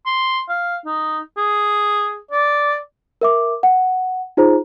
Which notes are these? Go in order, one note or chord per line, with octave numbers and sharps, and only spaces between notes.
C6
F5
D#4
G#4
D5
A#4 E5 D6
F#5
D#4 F4 G#4 C5 A#5